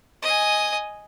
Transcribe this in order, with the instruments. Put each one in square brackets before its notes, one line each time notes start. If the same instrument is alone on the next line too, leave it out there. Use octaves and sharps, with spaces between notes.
[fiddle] D#5 G#5